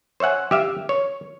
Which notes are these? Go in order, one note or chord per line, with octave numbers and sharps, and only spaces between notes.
C5 C#5 E5 F#5 G#5
G4 E5 F5
C#5